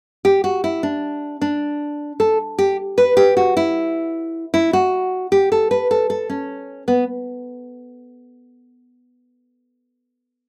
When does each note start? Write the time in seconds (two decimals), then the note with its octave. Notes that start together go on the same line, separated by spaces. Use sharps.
0.25 G4
0.44 F#4
0.64 E4
0.83 D4
1.41 D4
2.20 A4
2.59 G4
2.98 B4
3.17 G4
3.37 F#4
3.57 E4
4.54 E4
4.73 F#4
5.32 G4
5.52 A4
5.71 B4
5.91 A4
6.10 A4
6.30 C#4
6.88 B3